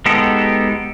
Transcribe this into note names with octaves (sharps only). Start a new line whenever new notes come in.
G#3 B3 D#4 G4 A4